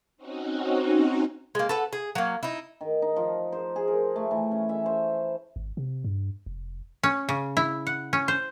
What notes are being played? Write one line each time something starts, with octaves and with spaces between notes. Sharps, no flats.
C4 C#4 D#4 F#4
G#3 A#3
A4 B4 F#5
G#4
F#3 A#3
D#4 E4
D#3
D#4
F3
C5
G#4
A#4
A3
E3
C#4
E5
C5
G#1
C3
G2
F1
C#4
C#3
E4
F#5
C#4
C5